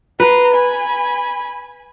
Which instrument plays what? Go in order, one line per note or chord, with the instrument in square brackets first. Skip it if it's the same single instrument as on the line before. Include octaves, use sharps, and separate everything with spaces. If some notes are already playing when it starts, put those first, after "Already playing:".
[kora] B4 [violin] A#5 C6
[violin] G#5 B5